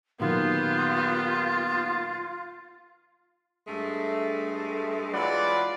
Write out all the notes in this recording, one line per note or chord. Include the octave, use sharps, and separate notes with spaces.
A#2 D#3 F#3 B3 F4 G4
G2 G#3 A3
E3 F#3 G#3 F4 B4 D5